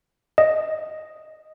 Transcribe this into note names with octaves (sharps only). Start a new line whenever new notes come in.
D#5